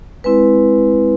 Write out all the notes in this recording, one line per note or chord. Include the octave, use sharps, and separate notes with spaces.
G#3 C4 E4 B4